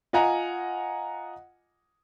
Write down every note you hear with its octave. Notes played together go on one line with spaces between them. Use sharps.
F4 D#5 F#5 G#5 A#5